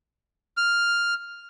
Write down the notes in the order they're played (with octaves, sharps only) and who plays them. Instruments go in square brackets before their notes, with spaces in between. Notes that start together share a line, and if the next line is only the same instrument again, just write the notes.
[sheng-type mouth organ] F6